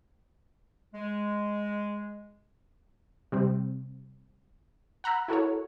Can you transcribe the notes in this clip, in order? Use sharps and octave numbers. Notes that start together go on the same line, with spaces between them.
G#3
C3 G3 C4
F#5 A#5 B5 E6 F#6
E4 F#4 A4 A#4 C#5